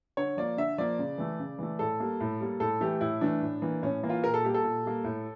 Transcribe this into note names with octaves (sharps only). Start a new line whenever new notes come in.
D3 C#5
F3 A#3 D5
D3 E5
F3 A#3 D5
C#3
E3 A3
C#3
E3 A3
A2 A4
G3 A#3
A2
G3 A#3
A2 A4
E3 A3 G4
A2 E4
E3 A3 D4
A2
E3 A#3
A2 C#4
E3 A#3
F4
A#2 A#4
A4
G3 A#3 G4
A4
A#2
G3 A#3
A2